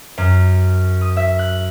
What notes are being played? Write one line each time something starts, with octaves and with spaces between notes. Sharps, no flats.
F#2
D#6
E5
F#6